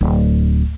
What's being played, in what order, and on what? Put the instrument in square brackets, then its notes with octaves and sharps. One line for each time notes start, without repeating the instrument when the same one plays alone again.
[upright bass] D1